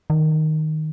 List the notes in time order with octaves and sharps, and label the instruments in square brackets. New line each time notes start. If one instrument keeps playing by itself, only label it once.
[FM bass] D#3